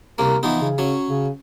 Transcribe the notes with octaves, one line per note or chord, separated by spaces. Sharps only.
C2 A#3 A#4
E3 F3 B3 D#4
C#3
F#3 C#4
C#3